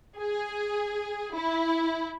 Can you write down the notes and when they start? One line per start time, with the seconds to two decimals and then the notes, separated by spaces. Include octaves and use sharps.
0.19 G#4
1.34 E4